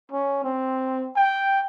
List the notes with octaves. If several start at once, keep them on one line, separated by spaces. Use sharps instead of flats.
C#4
C4
G5